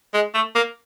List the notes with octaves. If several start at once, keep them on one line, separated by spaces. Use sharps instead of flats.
G#3
A3
A#3